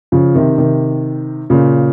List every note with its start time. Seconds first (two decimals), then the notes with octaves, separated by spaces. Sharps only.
0.12 C#3 F3
0.35 C3 D#3
0.58 C3 D#3
1.50 A#2 C#3